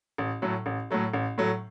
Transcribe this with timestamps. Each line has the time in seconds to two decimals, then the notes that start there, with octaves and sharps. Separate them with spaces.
0.18 A1
0.42 A2 F#3 A3
0.66 A1
0.91 A2 F#3 A3
1.14 A1
1.38 A2 F#3 A3